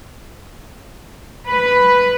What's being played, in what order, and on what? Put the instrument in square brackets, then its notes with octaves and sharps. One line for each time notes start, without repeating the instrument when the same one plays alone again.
[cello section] B4